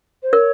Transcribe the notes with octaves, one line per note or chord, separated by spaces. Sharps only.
C5
A#4 C#5